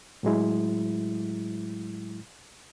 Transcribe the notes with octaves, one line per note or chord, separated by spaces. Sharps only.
A2 F#3 G#3 E4